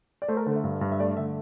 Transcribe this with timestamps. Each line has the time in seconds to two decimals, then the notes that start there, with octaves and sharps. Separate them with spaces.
0.22 D5
0.28 A3 C5
0.37 A#4
0.46 D3 C5
0.56 E5
0.64 G2
0.81 G2
0.92 E5
0.99 A3 D5
1.17 D3 E5